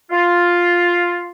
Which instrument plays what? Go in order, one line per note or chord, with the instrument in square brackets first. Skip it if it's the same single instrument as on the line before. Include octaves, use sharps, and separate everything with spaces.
[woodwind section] F4